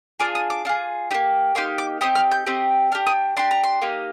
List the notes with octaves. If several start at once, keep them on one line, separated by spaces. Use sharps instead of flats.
D4 F4 G#4 D6
D#6
D6
D4 F4 G#4
A#3 D#4 G4
A#3 D#4 G4 C6
D6
C4 D#4 G4 D#6
F6
G6
C4 D#4 G4
D4 G4 F6
D#6
D4 G4 C6
A#5
C6
A#3 D#4 G4